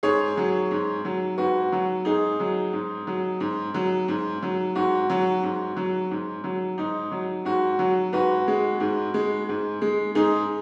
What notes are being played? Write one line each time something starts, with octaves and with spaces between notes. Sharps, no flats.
G#2 G#4 C#5
F#3
G#2
F#3
G#2 F#4 B4
F#3
G#2 D#4 G#4
F#3
G#2
F#3
G#2
F#3
G#2
F#3
G#2 F#4
F#3
G#2
F#3
G#2
F#3
G#2 D#4
F#3
G#2 F#4
F#3
G#2 F#4 B4
G#3
G#2
G#3
G#2
G#3
G#2 D#4 G#4